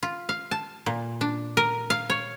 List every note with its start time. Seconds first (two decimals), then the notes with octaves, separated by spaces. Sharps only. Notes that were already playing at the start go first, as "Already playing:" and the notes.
0.03 F4
0.29 F5
0.51 A5
0.86 A#2
1.21 D4
1.57 A#4
1.90 F5
2.10 C#5